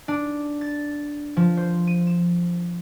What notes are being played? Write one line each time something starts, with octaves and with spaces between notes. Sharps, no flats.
D4
A6
F3
C5
D#7
E7